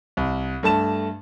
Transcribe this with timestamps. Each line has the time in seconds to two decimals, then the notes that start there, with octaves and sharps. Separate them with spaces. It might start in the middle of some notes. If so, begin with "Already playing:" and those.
0.17 C2
0.63 G2 A3 A5 E7